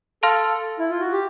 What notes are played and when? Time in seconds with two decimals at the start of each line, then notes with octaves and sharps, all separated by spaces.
0.23 A4 F5 A5 C6 F6
0.79 E4
0.90 F4
1.01 F#4
1.12 G4